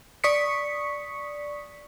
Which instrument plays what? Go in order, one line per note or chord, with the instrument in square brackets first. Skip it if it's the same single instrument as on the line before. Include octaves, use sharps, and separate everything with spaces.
[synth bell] D5 C#6 D#6 B6 C#7